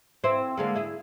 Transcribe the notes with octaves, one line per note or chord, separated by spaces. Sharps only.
C4 E4
D3 G#3 A#3
E4 G#4